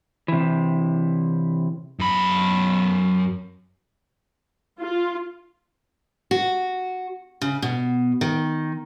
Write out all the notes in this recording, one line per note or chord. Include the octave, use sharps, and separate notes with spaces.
C3 E3
F#2 B5
F4
F#4
C#3
B2
D#3